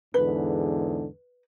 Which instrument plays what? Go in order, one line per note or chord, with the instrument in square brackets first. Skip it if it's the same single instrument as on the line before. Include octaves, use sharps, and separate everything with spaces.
[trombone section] E2 G#2 D3 [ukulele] B4